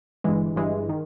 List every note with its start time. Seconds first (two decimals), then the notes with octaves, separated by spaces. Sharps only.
0.24 G1 G2 E3 G#3
0.56 G1 G2 E3 G#3
0.89 D#3